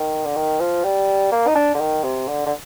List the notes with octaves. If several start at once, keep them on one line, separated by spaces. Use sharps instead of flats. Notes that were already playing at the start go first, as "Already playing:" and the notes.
Already playing: D#3
D3
D#3
F3
G3
A#3
D#4
D4
D3
D#3
C3
D3
D3